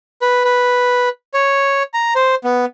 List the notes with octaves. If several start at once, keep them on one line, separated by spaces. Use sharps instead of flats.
B4
B4
C#5
A#5
C5
B3